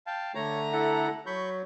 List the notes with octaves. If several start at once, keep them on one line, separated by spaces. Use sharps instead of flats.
F5 G5 A5
D3 A3 C#5 A#5
E4 A4 F#5
F#3 B5 C#6 G6